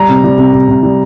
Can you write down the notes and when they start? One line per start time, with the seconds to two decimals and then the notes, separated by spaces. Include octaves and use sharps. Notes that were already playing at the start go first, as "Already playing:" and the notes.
Already playing: G3 A#5
0.09 C3
0.24 G3
0.38 C3
0.53 C3
0.68 C3
0.83 G3